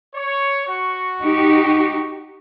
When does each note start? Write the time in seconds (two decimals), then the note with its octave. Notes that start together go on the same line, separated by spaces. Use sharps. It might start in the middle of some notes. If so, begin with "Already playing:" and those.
0.15 C#5
0.66 F#4 C#6
1.22 D#4 G4